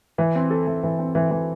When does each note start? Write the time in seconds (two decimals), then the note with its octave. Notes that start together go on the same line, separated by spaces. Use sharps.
0.18 E3
0.35 C4
0.50 A4
0.67 E3
0.83 E3
0.99 C4
1.15 E3
1.31 E3